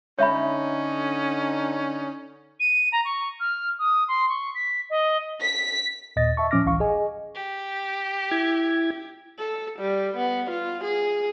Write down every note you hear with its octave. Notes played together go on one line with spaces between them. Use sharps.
D3 C#4 D#4 C#5 E5 B5
D#7
A#5
C#6
F6
D#6
C6
C#6
B6
D#5
B6
D#2 A#2 D#5 A6 A#6
E5 A5 C#6
A2 F3 C#4 D6 F6 A#6
G#1 C#2 E3 F5 C#6
G#4 D#5 G#5
G4
E4 G#6
A4
G3
B3
F4
G#4